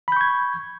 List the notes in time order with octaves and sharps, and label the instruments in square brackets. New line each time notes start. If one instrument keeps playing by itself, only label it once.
[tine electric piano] B5
G6
C#6
G#6